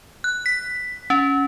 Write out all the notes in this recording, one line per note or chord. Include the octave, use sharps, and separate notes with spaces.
F#6
B6
C#4